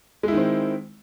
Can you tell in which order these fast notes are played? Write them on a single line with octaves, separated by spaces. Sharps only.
G#3 E4 D#3 C4